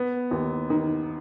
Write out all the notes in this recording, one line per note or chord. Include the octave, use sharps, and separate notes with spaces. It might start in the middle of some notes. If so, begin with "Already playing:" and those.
Already playing: B3
D#2
D#3